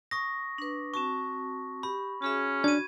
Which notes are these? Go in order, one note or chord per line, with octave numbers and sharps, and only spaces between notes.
C#6 D#6 A#6
D4 B4
C4 F#4 A5 C#6
G4 B5
C#4 F#4 G#4 E5
D4 F#4 G#6 D#7